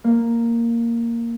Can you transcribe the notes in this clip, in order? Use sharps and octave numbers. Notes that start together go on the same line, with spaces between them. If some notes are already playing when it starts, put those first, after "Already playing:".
A#3